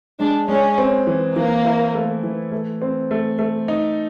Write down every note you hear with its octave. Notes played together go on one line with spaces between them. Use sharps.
G#3 D4
G#3 C#4
C4
E3
E3 A#3
E4
A3
E3
A3
C4
A3
A3
D#4